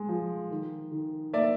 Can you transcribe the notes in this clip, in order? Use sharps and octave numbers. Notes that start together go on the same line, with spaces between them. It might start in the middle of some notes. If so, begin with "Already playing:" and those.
Already playing: G#3
F3
D#3
D#3
A#3 D5 E5